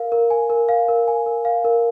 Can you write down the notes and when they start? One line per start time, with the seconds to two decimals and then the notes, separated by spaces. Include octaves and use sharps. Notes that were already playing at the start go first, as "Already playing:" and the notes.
Already playing: A#4 F5
0.12 A#4
0.30 G#5
0.50 A#4
0.69 F5
0.88 A#4
1.08 G#5
1.26 A#4
1.45 F5
1.64 A#4